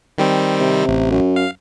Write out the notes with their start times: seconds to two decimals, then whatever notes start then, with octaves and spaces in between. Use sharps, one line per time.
0.18 D#3 G3 C4
0.60 C3
0.87 A1
1.11 F#2
1.36 F5